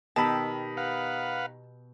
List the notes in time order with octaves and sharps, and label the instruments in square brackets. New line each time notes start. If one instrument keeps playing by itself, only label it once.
[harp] B2 G4 E6 [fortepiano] D#3 B5 [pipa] A5
[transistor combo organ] B4 F5 F#5